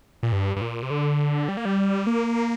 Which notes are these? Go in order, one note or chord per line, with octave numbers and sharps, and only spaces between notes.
A#2
G2
G2
A#2
C3
D3
G3
A#3
G3
A#3